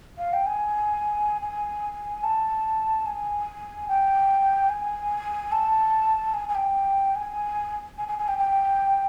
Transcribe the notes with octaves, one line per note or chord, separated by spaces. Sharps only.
F5
G5
G#5
G#5
A5
G#5
G5
G#5
A5
G#5
G#5
G5
G#5
G#5
G#5
G#5
G5
G5